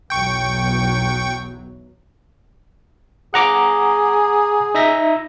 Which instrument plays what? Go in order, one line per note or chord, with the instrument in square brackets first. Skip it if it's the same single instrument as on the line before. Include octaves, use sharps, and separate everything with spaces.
[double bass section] B1 E2 F#3 [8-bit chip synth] G5 C#6
[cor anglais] G#4 [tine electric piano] F#5 A#5 D6
[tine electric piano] D#4 E5 A#6